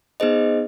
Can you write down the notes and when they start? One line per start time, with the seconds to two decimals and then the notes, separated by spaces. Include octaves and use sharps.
0.20 B3 D#4 G#4 C5 D#5